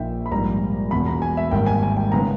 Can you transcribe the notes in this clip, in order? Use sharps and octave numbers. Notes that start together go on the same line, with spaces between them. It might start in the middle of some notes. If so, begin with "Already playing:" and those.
Already playing: A#1 A#2 A#3 D#4 E5 G5
B5
A#1 G#2 G3 A#5
E1 E2 B2 B5
A#5
G#5
E5
G#1 G#2 G3 A#3 G5
G#5
G#5
G5
C#3 G#3 B3 D#4 A#5